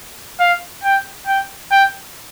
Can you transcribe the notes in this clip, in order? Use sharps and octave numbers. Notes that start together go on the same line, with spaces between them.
F5
G5
G5
G5